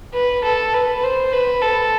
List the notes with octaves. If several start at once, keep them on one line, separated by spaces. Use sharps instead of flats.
B4
A4
B4
C5
B4
A4